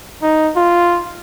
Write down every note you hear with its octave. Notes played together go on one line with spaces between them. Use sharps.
D#4
F4